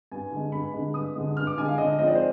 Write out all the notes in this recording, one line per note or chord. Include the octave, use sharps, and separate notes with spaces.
G2 G#5
D3 G#3
G2 B5
D3 G#3
G2 D#6
D3 G#3
G2 F6
D6
D3 G#3 G#5
F5
D3 D#5
F3 G#3 C4 D#4 D#5
D5
C5